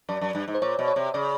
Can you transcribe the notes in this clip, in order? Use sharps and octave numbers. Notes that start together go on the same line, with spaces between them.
F#2 D5
F#2
G2
G#2
C5
A#2 C#5
B2
C#5
C3
C#3 D5